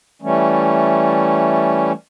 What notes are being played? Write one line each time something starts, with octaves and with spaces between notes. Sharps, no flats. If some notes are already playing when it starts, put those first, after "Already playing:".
E3 G3 A3 C#4